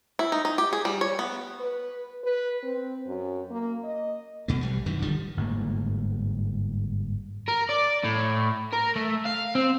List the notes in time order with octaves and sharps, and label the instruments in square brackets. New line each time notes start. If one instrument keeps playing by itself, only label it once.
[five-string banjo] E4
D#4
D#4
G4
G#4
G3
C#5
B3
[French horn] B4
B4
C4
F#2
A#3
D#5
[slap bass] C2 B2 A3
B1 G3
F#2 D#3 E3
D3 D#3 F3 G3
G1 G#2 A3 A#3
[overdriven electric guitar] A#4
D5
A2
A#4
A3
F5
C4